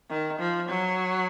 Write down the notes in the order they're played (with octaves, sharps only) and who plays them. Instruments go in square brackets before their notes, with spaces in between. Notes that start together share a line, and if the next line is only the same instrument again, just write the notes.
[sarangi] D#3
F3
F#3